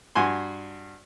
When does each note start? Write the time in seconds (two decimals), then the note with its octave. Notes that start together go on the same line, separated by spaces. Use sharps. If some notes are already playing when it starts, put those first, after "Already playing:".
0.15 G2 F#4 G#5 C6